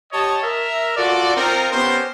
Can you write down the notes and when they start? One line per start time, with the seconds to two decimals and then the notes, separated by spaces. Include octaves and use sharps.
0.12 G4 C#5 D#5 A5
0.43 A#4 E5
0.96 F4 F#4 A4 D5
1.36 C4 D#4 F4 A#4
1.72 B3 C#4 G4 A#4 C5